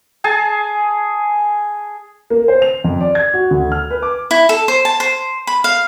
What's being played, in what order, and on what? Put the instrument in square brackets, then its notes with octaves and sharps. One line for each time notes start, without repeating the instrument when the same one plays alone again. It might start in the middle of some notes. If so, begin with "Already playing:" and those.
[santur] G#4 G#5 A5
[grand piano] A#3
C5
F7
F2
D5
G#6
F#4
D2
F6
B4
D6
[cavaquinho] E4
A4
C5
A5
C5
B5
F5